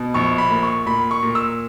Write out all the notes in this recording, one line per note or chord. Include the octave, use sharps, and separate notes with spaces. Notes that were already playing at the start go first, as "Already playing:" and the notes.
Already playing: B2
A#1 C#6
B5
A#2
C#6
A#2 B5
C#6
A#2
E6